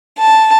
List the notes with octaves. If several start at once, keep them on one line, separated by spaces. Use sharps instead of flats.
A5